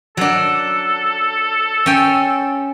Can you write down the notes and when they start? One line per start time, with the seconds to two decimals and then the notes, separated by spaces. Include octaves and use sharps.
0.17 F#3 D4 A4
1.86 C#4 G5